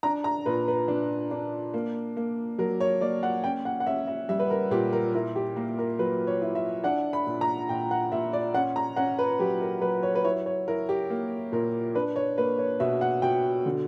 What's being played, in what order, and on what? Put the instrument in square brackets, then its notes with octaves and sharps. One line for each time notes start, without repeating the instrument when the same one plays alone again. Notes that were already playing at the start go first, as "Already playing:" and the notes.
[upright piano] D4 A#5
A#5
A#2 B4
B4
D4
D4
A#3
A#3
F#3 A#4
C#5
A#3 D5
F#5
C#4 G5
F#5
F#5
C#4 E5
E5
G3 E5
B4
A#4
A#2 G4
A#4
E4 A#4
G4
A#3 A#4
A#4
F#3 B4
C#5
E4
E5
D4 F#5
B5
A#2
A#5
A#2 G5
F#5
A#2 E5
D5
C#4 F#5
A#5
C#4 F#5
B4
F#3 G4
A#4
F#3 B4
C#5
B4
E4 C#5
C#5
E4 A#4
G4
A#3
A#2 A#4
D4 B4
C#5
A#3 B4
C#5
B2 E5
F#5
B2 G5
D3